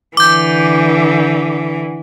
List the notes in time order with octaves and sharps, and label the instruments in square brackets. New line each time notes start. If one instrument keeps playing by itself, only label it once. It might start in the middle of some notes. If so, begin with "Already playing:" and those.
[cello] D3 E3 [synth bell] D6 G6